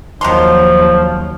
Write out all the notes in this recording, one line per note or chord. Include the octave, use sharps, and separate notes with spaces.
D#2 D#3 F3 F#3 A#5 C6